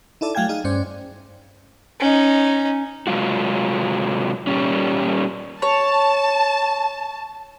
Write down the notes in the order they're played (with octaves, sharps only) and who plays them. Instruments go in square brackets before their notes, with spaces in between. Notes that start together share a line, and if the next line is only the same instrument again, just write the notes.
[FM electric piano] D#4 E4 A4 D5
F#3 A3 F5 G5 G#5 G#6
D#4 G#4 F5
G2 C#4 C5 D5
[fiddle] C#4 D#4
[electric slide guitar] C3 F#3 G#3 F4 F#4
A#2 G3 C#4
[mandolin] C#5 [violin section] A5